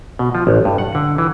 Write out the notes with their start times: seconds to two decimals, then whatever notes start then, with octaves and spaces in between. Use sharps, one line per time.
0.19 B2
0.35 F3
0.47 A1
0.65 G2
0.78 F#5
0.95 D3
1.18 E3